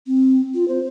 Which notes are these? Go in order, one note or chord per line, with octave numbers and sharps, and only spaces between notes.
C4
F4
C5